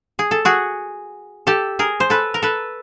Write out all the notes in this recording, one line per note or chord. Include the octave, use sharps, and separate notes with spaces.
G#4
A4
F#4 G#4
G4 A4
G#4 A#4
C5
A4 B4
A#4
A4 B4